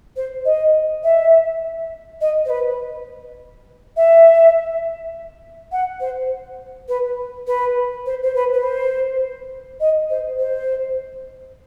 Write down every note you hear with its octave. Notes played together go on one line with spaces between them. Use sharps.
C5
D#5
E5
D#5
C5
B4
E5
F#5
C5
B4
B4
C5
C5
B4
B4
C5
D#5
C5
C5